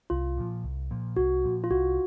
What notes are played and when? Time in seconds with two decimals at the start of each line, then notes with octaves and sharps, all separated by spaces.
0.10 C2 F4
0.37 A#2 F3
0.64 C2
0.91 A#2 F3
1.16 C2 F#4
1.44 A#2 F3
1.64 F4
1.70 C2 F#4